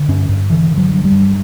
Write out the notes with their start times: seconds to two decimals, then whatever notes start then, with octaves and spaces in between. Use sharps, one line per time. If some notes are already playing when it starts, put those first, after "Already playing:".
Already playing: D3
0.08 G2 C#4
0.29 G2
0.50 D3 E3
0.71 D3
0.77 F#3
0.91 G2
1.05 G3
1.12 G2